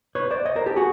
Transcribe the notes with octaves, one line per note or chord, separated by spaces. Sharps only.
B4 C#5
C5 D5
C#5 D#5
A#4 C5
G4 A4
F#4 G#4